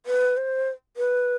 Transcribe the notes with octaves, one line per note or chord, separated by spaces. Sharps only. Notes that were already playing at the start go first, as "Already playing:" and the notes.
B4
C5
B4